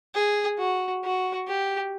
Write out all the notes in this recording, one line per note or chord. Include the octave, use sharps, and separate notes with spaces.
G#4
F#4
F#4
G4